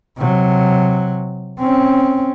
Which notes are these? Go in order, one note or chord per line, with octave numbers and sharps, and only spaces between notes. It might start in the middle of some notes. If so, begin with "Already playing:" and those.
C3 F#3
C4 C#4